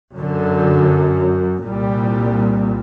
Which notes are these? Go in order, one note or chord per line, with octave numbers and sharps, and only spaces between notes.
F#2 D3
C2 A#2 G3